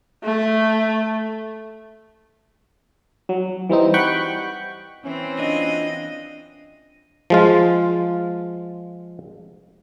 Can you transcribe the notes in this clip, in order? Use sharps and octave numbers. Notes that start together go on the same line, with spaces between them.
A3
F#3
E3 G3 C4 D#4
F#5 G5 B5 C#6 F#6
E3 C4 C#4
D4 F4 D#5
F3 G#3 F4